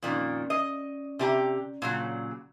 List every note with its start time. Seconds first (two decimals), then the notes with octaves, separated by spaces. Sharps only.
0.02 F2 A#2 D#3 C#4 D5
0.50 D#5
1.19 C3 G4 A#5
1.82 A#2 C#3 F#3